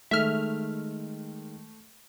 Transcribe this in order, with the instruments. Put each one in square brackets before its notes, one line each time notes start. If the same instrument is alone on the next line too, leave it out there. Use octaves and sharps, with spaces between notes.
[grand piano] D#3 G#3 [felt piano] A3 [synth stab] E5 F6